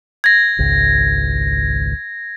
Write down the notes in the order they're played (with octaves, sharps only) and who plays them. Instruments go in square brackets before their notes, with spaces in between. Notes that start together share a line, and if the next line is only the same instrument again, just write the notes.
[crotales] G#6 A#6
[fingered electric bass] G#1 C#2